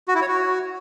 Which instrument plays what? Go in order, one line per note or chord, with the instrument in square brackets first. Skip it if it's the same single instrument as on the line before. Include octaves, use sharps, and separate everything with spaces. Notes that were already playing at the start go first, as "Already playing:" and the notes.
[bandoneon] F#4
E4
C#5
F#4